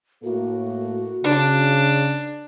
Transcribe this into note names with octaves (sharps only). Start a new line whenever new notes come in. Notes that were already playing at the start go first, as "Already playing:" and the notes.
A2 A#3 F#4 A4
C#3 D4